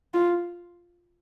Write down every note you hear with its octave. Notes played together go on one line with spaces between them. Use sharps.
F4